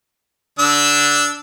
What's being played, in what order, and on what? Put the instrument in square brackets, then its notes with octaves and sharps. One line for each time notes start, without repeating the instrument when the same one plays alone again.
[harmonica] D3 D4 E6